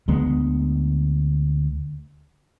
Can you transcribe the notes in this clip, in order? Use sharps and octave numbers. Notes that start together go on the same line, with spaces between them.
D2 D3 G#3 B3